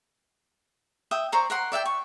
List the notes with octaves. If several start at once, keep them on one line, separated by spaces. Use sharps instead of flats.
E5 G5 D#6
C5 D5 A#5 C#6
A#4 F#5 C6
D5 E5 F5 G5
C#6